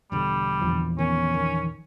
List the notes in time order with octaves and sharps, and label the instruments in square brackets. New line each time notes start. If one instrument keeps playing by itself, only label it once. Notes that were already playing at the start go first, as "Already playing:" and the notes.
[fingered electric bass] E1 B2 D3 [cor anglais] G3
[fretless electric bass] A#1 E2 F3
[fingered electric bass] D#3 B3 [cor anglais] C#4
[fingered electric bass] D#3